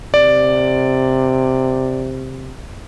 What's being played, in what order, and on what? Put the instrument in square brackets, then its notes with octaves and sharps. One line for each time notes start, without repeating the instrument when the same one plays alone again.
[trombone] C3 [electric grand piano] D5